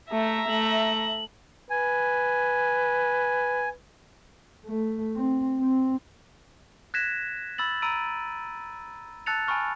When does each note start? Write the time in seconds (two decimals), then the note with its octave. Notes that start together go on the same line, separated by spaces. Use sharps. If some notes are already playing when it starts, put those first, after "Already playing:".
0.12 A3 E5 A#5
0.49 A3 F#7
1.70 B4 G#5
4.65 A3
5.16 C4
5.60 C4
6.94 F#6 G#6 A#6 B6 E7
7.58 B5 E6 A6 F#7
7.82 A#5 B5 E6 D7 D#7
9.26 A5 E6 F#6 A6 C#7 F7
9.47 G#5 A5 B5 C#6 F6